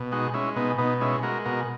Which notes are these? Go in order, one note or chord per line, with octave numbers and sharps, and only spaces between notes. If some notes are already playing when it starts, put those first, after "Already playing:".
Already playing: B2
G#3 D#4 F#4
G#3 C#4 E4
B2 B3 D#4
B2 B3 D#4
G#3 C#4 E4
G#3 F#4 A#4
B2 F#4 A#4